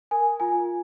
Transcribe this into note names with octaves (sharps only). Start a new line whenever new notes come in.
A#4 G#5
F4 G#5